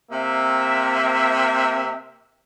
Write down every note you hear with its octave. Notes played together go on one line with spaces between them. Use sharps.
C3 A#3 C4 E5